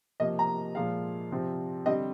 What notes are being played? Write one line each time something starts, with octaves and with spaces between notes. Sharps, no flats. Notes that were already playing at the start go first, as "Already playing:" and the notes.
C3 F3 A#3 D#5
A#5
A#2 F3 G#3 F5
C3 F3 C4
D3 G3 C4 D#5